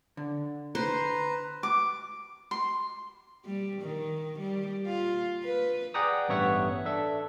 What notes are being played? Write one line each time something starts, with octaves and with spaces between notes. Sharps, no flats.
D3
B4 C5 A#5
D6
C6
G3
D#3
G3
F4
B4
G#4 D5 F#5 G5 A#5 D#6
A1 G2 B3 C#5 E5 F#5
D4 A4 E5